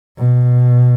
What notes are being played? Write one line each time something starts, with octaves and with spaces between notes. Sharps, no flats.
B2